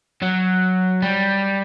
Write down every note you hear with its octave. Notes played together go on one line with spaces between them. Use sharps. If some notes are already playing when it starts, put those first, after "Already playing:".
F#3
G3